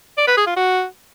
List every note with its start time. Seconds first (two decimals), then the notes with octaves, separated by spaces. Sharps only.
0.18 D5
0.28 B4
0.37 G#4
0.47 F4
0.57 F#4